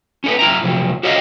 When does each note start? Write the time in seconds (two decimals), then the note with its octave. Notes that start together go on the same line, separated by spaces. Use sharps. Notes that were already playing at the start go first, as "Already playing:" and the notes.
0.24 C#4 A4 B4
0.39 F#2 E4 A#4 A#5
0.63 A2 C3 F3 F#3
1.03 F#4 G4 A#4 C#5 D#5 F5